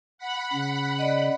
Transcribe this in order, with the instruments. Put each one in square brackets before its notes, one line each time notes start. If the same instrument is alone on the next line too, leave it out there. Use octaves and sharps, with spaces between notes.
[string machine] F#5 B5
[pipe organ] C#3
[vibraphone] D5 D#5